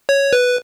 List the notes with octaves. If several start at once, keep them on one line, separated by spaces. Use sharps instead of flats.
C#5
B4